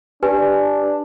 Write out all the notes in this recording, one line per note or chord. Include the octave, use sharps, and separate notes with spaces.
D4 G4 B4 G#5